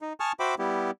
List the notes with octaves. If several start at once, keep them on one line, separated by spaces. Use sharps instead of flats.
D#4
G#5 A5 C#6 D#6 F6
F#4 C5 E5 G5 B5 D6
G3 B3 E4 G4